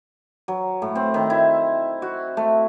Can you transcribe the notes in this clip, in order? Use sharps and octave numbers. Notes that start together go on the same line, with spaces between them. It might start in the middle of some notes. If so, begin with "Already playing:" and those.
F#3
A2
C4
D#3
E4
F#4
A3